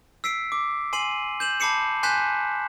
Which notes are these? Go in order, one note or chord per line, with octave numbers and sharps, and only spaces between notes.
E6 B6 C7 D7
D6
G#5 C6 C7 D#7 F#7
G6 E7 F#7
A5 B5 D6 C7 C#7 E7
G#5 C6 F#6 G6 B6 E7